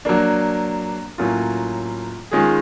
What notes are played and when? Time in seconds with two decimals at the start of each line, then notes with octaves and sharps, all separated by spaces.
0.05 F#3 A#3 D4
1.18 A2 F#3 A#3 C#4 F4
2.31 D#3 G#3 C#4 F4 G#4